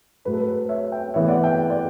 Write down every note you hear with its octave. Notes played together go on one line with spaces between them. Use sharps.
A2 F#3 A3 B4
A4
B4
C#5 E5
E5 G5
A2 E3 B3 C#5 E5
D5 F#5
E5 G5
D5